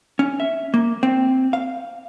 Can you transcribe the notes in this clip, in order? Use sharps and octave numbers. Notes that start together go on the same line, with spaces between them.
C#4
E5
A#3
C4
F5